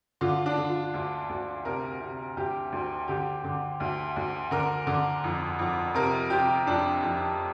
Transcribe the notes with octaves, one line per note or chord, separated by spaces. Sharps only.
D3 F4
D4
D3
F4
D2
D2
C3 A#4
C3
D2 G4
D2
D3 G4
D3
D2
D2
D3 A#4
D3
F2
F2
C3 A#4
C3 G4
F2 D4
F2